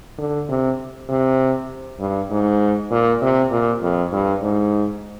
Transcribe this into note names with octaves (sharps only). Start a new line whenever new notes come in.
D3
C3
C3
G2
G#2
A#2
C3
A#2
F2
G2
G#2